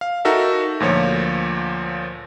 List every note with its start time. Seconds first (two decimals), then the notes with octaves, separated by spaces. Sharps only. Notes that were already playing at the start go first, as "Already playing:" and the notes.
0.01 F5
0.25 D#4 F#4 A4 A#4 E5
0.80 D2 A#2 F3 C#5